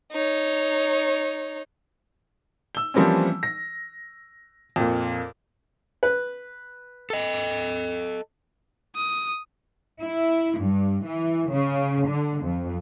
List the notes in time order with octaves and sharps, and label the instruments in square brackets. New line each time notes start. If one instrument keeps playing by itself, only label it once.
[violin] D#4 C#5
[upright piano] E6 G7
E3 F3 G3 A#3 C4 C#4
A#6
F2 A#2
[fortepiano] B4
[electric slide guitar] A4 D#5
[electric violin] D#6
[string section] E4
G2
E3
C#3
D3
F2